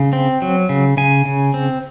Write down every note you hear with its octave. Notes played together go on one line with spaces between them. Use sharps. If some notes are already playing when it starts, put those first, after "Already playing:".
Already playing: C#3
C4
F#3
C#3
C#3 G#5
C#3
C4